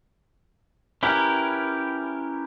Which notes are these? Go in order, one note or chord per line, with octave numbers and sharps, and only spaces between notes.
C#4 E4 G4 A#4 B4